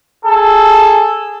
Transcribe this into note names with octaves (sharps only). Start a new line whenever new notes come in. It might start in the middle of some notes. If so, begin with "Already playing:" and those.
G#4 A4